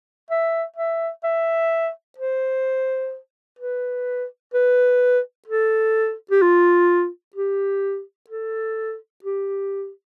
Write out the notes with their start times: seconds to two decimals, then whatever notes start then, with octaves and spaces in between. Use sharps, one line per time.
0.30 E5
0.76 E5
1.24 E5
2.18 C5
3.59 B4
4.54 B4
5.48 A4
6.31 G4
6.42 F4
7.35 G4
8.29 A4
9.24 G4